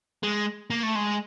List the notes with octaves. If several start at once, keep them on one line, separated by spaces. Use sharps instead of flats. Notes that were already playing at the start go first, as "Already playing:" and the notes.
G#3
A#3
A3
G#3